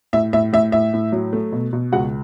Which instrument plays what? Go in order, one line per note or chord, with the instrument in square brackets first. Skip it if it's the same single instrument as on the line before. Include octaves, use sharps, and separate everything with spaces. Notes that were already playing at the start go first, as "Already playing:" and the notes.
[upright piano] A2 E5
A2 E5
A2 E5
A2 E5
A2
F#3
A3
B2
B2
C#2 F#4 F#5